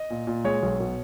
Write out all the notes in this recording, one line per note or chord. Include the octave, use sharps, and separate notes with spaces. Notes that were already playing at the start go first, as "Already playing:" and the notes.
Already playing: D#5
A#2
A#2
G#3 C#5
B1
B2